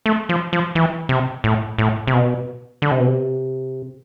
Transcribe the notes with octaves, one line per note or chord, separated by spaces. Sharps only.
A3
F3
F3
E3
C3
A2
A2
C3
B2
D3
C3
B2
C3